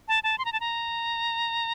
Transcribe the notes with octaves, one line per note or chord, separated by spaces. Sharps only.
A5
A5
C6
A#5
A5
A#5